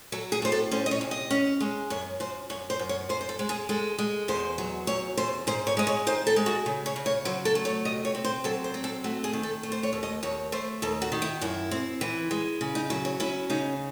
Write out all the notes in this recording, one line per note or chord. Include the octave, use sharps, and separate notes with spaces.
F#3 A4
G#4
A2 C5
A4
C#4 C5
D#5
C#5
C3
D#5
C#4
G#3
F#2 C#5
F#2 C5
F#2 C#5
C5
F#2
C#5
F#2 C5
C5
A4
G#3
G#4
G#3 A4
G#3
E2 C5
F#3
E2 C#5
E2 C5
G#2 C5
C#5
G#3 D#5
C#5
D#3 C5
A4
G#3
F#4
C#3
C#5
C#3
C#5
F#3 C5
A4
A3
C#5
C3 D#5
C#5
C4
C5
F#3 A4
C5
C4
A4
A3 F#4
G#4
D#3
A4
A3
C5
C#5
D#2
D#5
D#2 C#5
A3 C5
D#2 A4
F#4
D#3
E4
F#2 E4
C4
E3
G#3
C#3
D#4
F#3 E4
C#5
C#4 E4
C#3 D#4